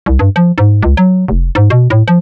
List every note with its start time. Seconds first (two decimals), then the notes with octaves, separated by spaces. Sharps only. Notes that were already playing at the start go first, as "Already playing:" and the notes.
0.06 C2
0.19 G2
0.36 F3
0.58 G#2
0.83 C#2
0.97 F#3
1.28 F1
1.55 G#2
1.70 B2
1.90 A2
2.08 F3